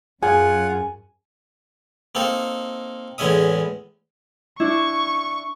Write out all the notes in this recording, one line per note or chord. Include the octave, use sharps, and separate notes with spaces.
F#2 F4 G#4 F#5 G#5
A#3 C4 D#4 A4
E2 A2 G#3 C#4 E5 D#6
D4 E4 C#6